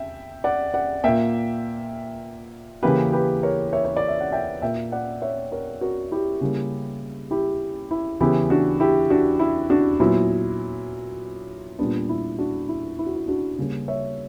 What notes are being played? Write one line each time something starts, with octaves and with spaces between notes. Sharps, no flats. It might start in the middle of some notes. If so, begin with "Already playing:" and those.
Already playing: E5 G5
D5 F#5
D5 F#5
A#2 A#3 E5 G5
C#3 E3 A#3 G4 B4
G4 B4
A#4 C#5
C#5 E5
C#5
D5
E5
F#5
E5 G5
A#2 A#3 E5 G5
D5 F#5
C#5 E5
A#4 C#5
F#4 A#4
E4 G4
C#3 G3 A#3
E4 G4
E4
C#3 E3 B3 E4 G4
D4 F#4
E4 G4
D4 F#4
E4
D4 F#4
A#2 F#3 B3 E4
A#2 G3 B3 D4
E4
D4 F#4
E4
E4
F#4
E4
D4 F#4
C#3 G3 A#3
C#5 E5